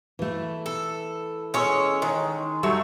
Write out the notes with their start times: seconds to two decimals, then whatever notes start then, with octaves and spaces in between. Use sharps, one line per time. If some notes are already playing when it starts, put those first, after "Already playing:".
0.19 E3 A3
0.66 A4
1.54 G#3 C#4 C#5 C#6 E6
2.02 D#3 G#3
2.63 F#3 G3 A3 C#6